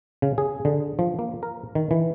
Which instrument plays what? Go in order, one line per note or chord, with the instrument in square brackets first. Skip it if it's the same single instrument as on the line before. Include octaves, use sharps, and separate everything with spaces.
[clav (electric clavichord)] C#3
G#4
D3
F3
A#3
A#4
D#3
E3